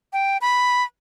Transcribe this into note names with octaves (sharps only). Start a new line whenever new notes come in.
G5
B5